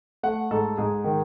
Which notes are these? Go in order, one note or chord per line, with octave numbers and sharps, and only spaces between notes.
A3 F#5
G#2 A4
G#2 G#4
D#3